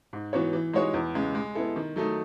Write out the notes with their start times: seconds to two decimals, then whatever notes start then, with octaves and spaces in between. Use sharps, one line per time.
0.13 G#2
0.33 E3 B3 F#4 C#5
0.53 E3
0.73 G#3 D#4 F#4 C#5
0.94 E2
1.14 C#3 G#3
1.35 G#3
1.55 B3 E4 A4
1.76 D#3
1.96 F#3 A3 D#4 A4